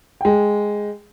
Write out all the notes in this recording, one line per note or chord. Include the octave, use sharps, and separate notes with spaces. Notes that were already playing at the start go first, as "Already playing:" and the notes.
G#3 G5